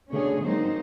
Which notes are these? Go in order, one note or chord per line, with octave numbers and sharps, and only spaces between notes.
B2 D3 A3 C#4 G#4 C#5
F#3 G#3 A#3 C4 D#4 C5